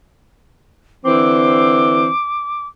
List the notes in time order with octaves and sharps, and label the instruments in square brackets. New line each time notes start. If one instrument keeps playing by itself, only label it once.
[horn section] D3 E3 C4 [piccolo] D6